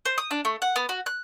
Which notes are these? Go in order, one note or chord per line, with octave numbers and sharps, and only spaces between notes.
C5
D#6
D4
A3
F#5
B3
F#4
F#6